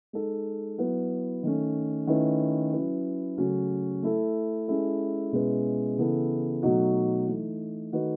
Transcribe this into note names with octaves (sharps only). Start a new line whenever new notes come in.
G#3 D#4 A4
F#3 B3 E4 B4
D#3 A3 C#4
D#3 A3 C#4 E4 B4
F#3 C#4 E4 B4
C#3 F#3 A3 C#4 F#4
A3 E4 A4
G#3 C#4 E4 A4
B2 G#3 C#4 E4 B4
C#3 E3 B3 E4 A4
B2 F#3 A3 D#4 F#4
E3 A3 D#4
D#3 A3 D#4 F#4 B4